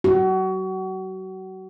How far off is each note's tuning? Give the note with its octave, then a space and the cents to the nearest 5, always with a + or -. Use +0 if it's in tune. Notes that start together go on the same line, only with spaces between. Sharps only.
F#4 +30